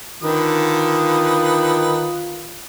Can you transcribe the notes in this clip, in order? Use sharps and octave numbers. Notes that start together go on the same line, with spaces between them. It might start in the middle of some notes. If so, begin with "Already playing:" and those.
D3 D#3 F4 B4 D#6